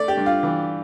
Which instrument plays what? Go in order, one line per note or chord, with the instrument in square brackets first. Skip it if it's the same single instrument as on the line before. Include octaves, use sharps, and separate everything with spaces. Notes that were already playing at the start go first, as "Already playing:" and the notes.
Already playing: [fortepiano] A3 D5
G4
G2
F4
E3